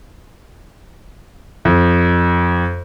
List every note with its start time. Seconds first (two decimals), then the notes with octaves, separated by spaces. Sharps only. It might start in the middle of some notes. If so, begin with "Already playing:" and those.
1.65 F2